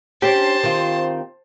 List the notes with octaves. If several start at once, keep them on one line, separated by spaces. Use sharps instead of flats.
C#4 D4 G4 C5 A5 C6
D#3 C4 F4